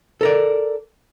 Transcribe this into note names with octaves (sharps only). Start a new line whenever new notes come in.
A4 A#4 D5